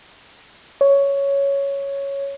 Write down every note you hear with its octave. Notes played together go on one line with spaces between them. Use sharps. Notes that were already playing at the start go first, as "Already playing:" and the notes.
C#5